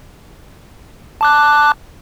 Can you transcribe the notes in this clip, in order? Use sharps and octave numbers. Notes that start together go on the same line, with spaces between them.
A5 D6 F#6